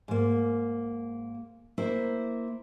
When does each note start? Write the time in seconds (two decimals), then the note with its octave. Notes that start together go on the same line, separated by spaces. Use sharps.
0.08 G#2 A#3
1.78 A#3 E4 C5